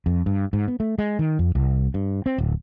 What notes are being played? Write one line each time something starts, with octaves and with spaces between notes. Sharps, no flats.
F2
G2
G#2
B3
A3
G#3
D#3
F2
C2
G2
C4
D1